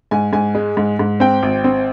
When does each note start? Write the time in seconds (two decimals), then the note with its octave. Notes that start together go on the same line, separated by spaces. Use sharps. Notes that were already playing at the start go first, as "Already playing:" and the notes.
0.11 G#2 G#5
0.33 G#2 G#5
0.55 G#3
0.77 G#2
0.99 G#2
1.20 C4 G5
1.43 G#1
1.64 C4